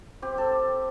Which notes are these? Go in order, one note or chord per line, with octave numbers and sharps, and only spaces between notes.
C4 G4
A4